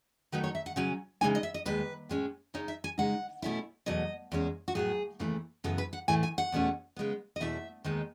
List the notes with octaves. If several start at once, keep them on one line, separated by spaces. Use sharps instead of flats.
D#3 F#3 A3 D#4 B4
C#5
E5
F#5
C#3 F#3 C#4 G#5
C#3 E3 G#3 D#4 G#5
D#5
E5
D#5
D#2 D#3 G#3 B4
A2 G#3 C#4
C#3 G#3 D#4 C#5
E5
G#5
C#3 G#3 D#4 F#5
B2 A3 C#4 E4
E2 B2 F#3 A3 D#5
E2 C#3 G#3 C#4
F#4
A2 F#3 B3 G#4
D#2 C#3 E3 A3
F#2 C#3 E3 B3 A4
B4
F#5
A2 E3 A3 G#5
G#5
F#5
E2 B2 A3 C#4
C#3 G#3 B3
D#5
E2 B2 A3 E4 E5
D#2 D#3 G#3 B3 D#4